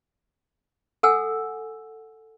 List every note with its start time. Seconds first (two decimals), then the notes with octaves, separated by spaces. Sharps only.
1.03 A4 F#5 G#5 E6